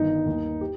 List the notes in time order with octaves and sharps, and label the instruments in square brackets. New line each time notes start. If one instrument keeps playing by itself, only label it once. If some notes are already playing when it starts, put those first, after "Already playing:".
Already playing: [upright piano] G1 G2 D#3 D#4
D#2
D#3
G4